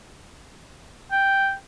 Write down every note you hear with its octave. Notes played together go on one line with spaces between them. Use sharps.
G5